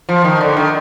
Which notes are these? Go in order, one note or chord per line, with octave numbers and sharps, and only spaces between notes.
F3
D#3
D3
D#3